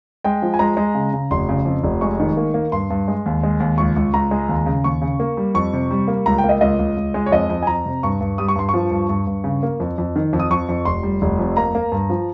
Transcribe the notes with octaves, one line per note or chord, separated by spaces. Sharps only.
G#3 G5
F3
G#5
G#3 A#5
G#3
C#3
C#3
F1 C6
C#3
F2
F1
G#3 C#6
D#3
A#3
A#3
G2 C6
G2
G#3
D#2
G#3
D#2
C#2 C#6
C#2
C#2 A#5
G#3
D#2
C#3
D#2 C#6
C#3
A#3
G3
F2 C#6
C3
G3
A#3
C#2 A#5
G5
A#3
D#5
C#2 D#5
C#2
C#2
G#3
C#5
F2 D#5
F2
G#5
F2 A#5
C3
G2 C#6
G2
G3 D#6
C#6
G2 C6
C#6
F3
G2
G2
G2
C#3
A#3
F2
F2
D#3
F2
D#6
F2 C#6
F2
F1 C6
G3
F1
F2
A#3 A#5
A#3
G2
F3